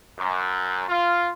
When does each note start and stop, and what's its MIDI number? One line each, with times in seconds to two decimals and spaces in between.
0.18 0.82 42
0.89 1.30 65